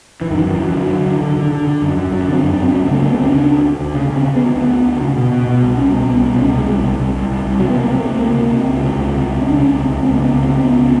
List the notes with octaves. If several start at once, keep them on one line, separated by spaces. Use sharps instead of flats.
E3
F#2 D#3
F#2
E3
F#2
F#3
D3
D3
D3
D3
D3
D3
D3
F#2
F#2
F#2 F#3
D3 C4
F#2
D4
F#2 C4
D2 C#4
C#3
A3
D2 A#3
B3
D2 C4
C#4
C#3 D4
D2
D2
D2
C#3 C#4
C#3
C4
C#3
B3
D2
C4
D2 B3
D2
D2
C#3
B2
B2
B2
C2
C2 C#4
B2
C4
C2 B3
B2
C2 C#4
C2
G#3
C2
C2
C2
C2
C2
C2
C3 F#3
C3 B3
A#3
C3
A3
C3
C#2 A#3
C3
C3
C#2
C3
C#2
C3
C#2
C#2 C#4
D4
C3 C#4
C#2
C#2
C#2 C4
C#3 A#3
B3
C#2
C4
C#3
C4
C#2 B3
C#3